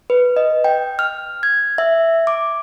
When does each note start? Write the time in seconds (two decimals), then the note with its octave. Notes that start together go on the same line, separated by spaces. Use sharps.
0.10 B4
0.36 D#5
0.64 G5
0.99 F6
1.43 G#6
1.78 E5
2.27 D6